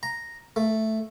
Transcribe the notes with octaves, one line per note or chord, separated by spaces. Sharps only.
A#5
A3